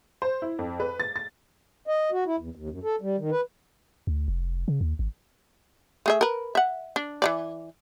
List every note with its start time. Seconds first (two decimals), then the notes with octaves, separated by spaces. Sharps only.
0.22 C5
0.42 E4
0.59 F2
0.80 B4
1.00 A6
1.16 A6
1.87 D#5
2.12 F#4
2.26 E4
2.38 E2
2.55 D#2
2.70 F#2
2.84 A4
3.01 G3
3.18 D#3
3.31 B4
4.07 D2
4.28 F1
4.68 C#3
4.81 D#2
4.99 G#1
6.06 A3 G#4 E5
6.21 A#4 B4
6.55 E5 F#5
6.96 D4
7.22 E3 G#3 D5